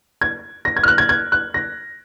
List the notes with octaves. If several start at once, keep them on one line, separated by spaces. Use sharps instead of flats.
G#6
A#6
G#6
F6
F#6
G#6
G#6
F#6
A#6